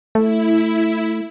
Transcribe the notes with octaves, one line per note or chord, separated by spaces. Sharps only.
A3 E4